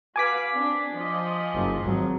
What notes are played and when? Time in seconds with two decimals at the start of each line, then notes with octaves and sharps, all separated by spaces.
0.16 F#4 B4 F5 G#5 D6 B6
0.51 C4 D4
0.92 F3 D#5
1.54 F#1
1.83 G#1 F#3